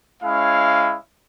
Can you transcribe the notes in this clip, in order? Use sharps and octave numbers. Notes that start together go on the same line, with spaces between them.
G#3 C#4 E4 F5